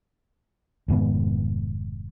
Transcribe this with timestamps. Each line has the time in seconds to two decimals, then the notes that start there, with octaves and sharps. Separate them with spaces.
0.88 F1 G#2 D#3 B3